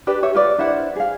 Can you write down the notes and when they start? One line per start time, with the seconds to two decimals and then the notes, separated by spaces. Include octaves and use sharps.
0.07 D4 G4 B4 D5
0.23 G4 C#5 E5
0.35 F4 B4 D5
0.58 D4 E4 C5 F#5
0.96 G#4 F5